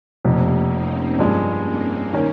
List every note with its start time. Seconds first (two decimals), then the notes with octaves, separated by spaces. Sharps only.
0.24 F1 F2 C3 F3 A#3 C#4
0.72 C4 D#4
1.18 G2 F3 G#3 A#3 C#4
1.65 C4 D#4
2.13 D#3 A#3 C#4